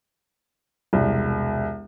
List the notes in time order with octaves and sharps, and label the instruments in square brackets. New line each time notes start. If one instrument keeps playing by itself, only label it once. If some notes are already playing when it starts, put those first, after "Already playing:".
[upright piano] E1 C2